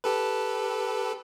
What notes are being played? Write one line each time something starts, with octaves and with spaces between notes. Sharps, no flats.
G4 A4 B4